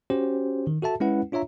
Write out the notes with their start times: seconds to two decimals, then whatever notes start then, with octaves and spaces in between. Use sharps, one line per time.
0.10 C#4 F#4 G4 C5
0.67 D#3
0.82 F#4 A4 E5 A5
1.00 G#3 C#4 E4 B4 F#5
1.32 D4 F4 C#5 E5 A#5